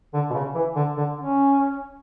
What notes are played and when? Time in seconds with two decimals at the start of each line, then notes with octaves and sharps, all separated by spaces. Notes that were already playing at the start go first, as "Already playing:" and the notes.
0.14 D3
0.30 B2
0.34 C#3
0.55 E3
0.76 D3
0.97 D3
1.19 C#4